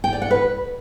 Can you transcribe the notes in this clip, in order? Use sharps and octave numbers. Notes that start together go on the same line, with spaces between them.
G5
D5
F#5
B4